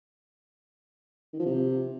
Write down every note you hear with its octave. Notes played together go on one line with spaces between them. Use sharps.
D#3
F3
C3